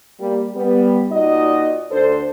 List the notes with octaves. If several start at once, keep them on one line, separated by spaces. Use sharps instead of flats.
G3 A#3
G3 B3
A#2 D#4 F#4 D5 D#5
D2 D4 A4 C5